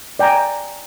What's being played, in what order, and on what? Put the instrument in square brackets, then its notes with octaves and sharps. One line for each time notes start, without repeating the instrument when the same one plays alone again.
[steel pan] D5 G5 G#5 A#5